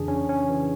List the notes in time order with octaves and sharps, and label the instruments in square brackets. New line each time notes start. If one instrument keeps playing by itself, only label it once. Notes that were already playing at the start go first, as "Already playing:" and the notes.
Already playing: [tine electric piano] F2 C#3 E3 D4 G#4
C#4
C#4
C#3 E3